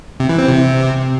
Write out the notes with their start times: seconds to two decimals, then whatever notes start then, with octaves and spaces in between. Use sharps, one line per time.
0.20 C3
0.29 E3
0.38 C4
0.48 C3